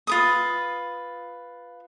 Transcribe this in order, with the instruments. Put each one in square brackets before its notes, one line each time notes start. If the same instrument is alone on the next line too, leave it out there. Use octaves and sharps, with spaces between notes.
[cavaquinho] F4 B4 D#6